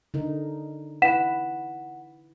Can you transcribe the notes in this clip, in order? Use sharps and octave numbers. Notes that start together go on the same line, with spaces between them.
D3 D#4 A#4
E4 B4 F#5 B6 E7